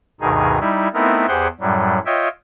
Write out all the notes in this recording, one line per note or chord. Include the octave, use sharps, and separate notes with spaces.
D2 G2 B2 D#3 D#4 G#4
G3 D#4 E4
A3 B3 C4 D#4 E4 A#4
E2 G4 G#4 C5 F#5 G6
F#2 A2 F#3 G3
F4 C#5 D#5 E5 G5